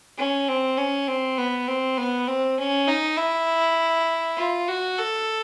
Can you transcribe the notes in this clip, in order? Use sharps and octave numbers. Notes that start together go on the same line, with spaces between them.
C#4
C4
C#4
C4
B3
C4
B3
C4
C#4
D#4
E4
F4
F#4
A4